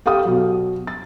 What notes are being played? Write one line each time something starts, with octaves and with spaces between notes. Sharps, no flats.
G4 A4 F5 G5 D#6
B2 F#3
A6